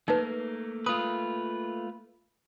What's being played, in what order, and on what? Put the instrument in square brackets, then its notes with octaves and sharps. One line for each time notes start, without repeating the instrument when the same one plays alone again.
[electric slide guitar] A3 A#3 A#4 [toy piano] D#4 B4
[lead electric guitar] F4 B4 [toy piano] D#6